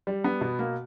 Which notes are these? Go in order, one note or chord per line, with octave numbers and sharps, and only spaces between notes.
G3
B3
B2
A#3